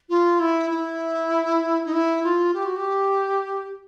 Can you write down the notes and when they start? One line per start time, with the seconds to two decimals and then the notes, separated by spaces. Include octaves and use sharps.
0.09 F4
0.40 E4
0.70 E4
1.86 D#4
1.93 E4
2.24 F4
2.54 G4
2.66 F#4
2.76 G4